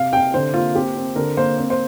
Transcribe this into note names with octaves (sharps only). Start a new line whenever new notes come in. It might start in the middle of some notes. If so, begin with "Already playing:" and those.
Already playing: C3 F5
C3 G5
D3 C5
A#3 F4
C4 G4
C4
D3 A#4
A#3 C5
C4
C5